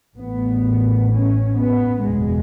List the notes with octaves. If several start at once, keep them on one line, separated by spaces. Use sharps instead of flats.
A1 A2 B3
C#4
B3
F#1 E2 B2 G#3